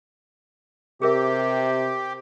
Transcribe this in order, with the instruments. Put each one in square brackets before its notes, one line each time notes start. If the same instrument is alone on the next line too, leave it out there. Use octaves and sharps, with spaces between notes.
[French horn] C3 [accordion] G4 [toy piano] G#4 A#4 E5